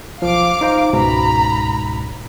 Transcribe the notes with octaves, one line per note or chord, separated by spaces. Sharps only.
B1 F3 F5 D6
D#4 C5 A#5
C#2 G#2 B2 A#5 B5